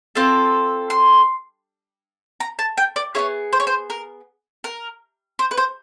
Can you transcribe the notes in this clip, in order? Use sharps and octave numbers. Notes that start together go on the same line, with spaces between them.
C4 F4 A4
C6
A#5
A5
G5
D5
B3 E4 G#4 C#5
C5
C#5
C5
A#4
A#4
C5
B4
C5